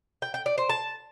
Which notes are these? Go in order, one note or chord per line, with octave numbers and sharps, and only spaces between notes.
G5
G5
D5
C5
A5